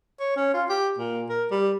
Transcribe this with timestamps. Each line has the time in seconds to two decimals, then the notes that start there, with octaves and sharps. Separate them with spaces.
0.20 C#5
0.37 C#4
0.54 F4
0.70 G4
0.98 A#2
1.29 A#4
1.51 G3